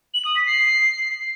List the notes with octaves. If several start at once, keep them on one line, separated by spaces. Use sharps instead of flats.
F#7
D#6
B6
C7